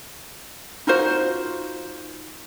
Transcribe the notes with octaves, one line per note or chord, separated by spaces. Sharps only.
D#4 F4 F#4 C5